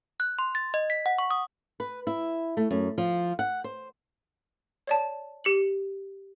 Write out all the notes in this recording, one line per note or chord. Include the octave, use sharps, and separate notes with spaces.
F#6
C6
A6
D#5
B6
F#5
C#6
D#6
B4
E4
A3
F#2
F3
F#5
C5
C#5 D5 A5
G4 C#7 F#7